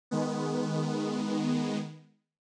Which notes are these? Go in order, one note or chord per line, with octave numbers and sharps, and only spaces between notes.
D#3 G#3 B3